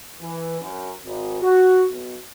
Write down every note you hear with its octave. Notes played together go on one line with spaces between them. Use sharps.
E3
F#2
G#1
F#4
B1